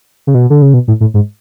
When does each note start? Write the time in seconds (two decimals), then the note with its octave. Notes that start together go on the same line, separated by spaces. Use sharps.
0.27 C#3
0.34 B2
0.50 D3
0.62 C#3
0.74 B2
0.88 A2
1.01 A2
1.14 G#2